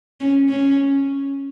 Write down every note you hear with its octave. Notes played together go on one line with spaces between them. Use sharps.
C#4
C#4